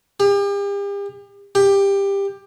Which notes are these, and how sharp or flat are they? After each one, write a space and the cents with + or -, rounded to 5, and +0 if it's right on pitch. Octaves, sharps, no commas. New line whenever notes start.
G4 +40
G4 +15